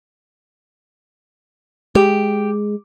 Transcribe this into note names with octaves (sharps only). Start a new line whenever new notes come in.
G#3 G4